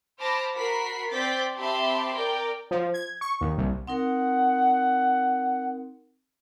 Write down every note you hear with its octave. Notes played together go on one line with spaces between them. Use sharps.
C5 A5 B5 D6 F6 A#6
F#4 A#4 B5 B6 C7
C4 C5 D5 G6 A6 B6
C4 G4 E5 A5 B5 C6
A#4 D5 G5
F3
G#6
C#6
D#2
C2
C4 D#4 A#4 F#5